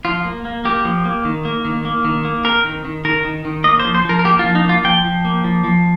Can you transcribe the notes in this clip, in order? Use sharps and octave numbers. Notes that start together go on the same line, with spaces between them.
F3 F4
A#3
A#3
A#3 G4
F3
A#3
D#3
A#3
D#3
A#3
D#3
A#3
C4 A#4
D#3
D#3
D#3 A#4
D#3
D#3
A#3 D#5
C5
F3
C5
F3 A#4
A#4
A#3 G4
F4
F3
D#4
A#3 F4
F3 G5
F3
A#3
F3
F3